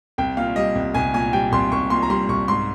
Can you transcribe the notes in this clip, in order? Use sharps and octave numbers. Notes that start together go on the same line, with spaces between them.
C2 G5
A#2 F5
G3 D#5
C2
C2 G#5
A#2 G#5
G3 G5
C2 C6
C2 C#6
A#2 C6
A#5
G3 C6
C2 C#6
G#2 C6